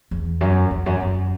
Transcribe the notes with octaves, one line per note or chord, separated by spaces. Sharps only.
E2
F#2
E2
F#2
F#2